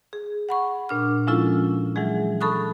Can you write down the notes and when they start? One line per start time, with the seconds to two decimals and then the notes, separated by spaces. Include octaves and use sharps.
0.13 G#4
0.49 F#5 B5 C#6
0.89 A#2 D4 F6
1.27 F3 G#3 C#4 E4 F4 A4
1.96 E3 F#3 G#3 G#4
2.41 A4 A5 B5 C#6 D#6 F#6